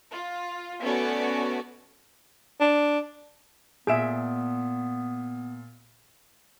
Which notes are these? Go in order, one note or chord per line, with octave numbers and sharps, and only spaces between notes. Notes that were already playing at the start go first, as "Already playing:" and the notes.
F4
A3 B3 C#4 F#4 C#5 D5
D4
A#2 B3 G#4 E5 D7 E7